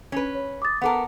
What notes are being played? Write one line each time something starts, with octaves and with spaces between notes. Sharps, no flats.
C#4 B4
C#5
D6 D#6 A6
B3 A4 A#4 F#5 D6